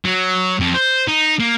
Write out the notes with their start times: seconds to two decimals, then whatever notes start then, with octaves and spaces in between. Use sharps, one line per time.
0.05 F#3
0.60 F2
0.74 C5
1.08 D#4
1.40 A#3